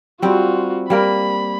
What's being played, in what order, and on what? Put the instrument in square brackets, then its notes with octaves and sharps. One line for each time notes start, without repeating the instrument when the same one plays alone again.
[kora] G3 C4 [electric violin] F4 F#4
[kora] G3 A#3 A#4 [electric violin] B5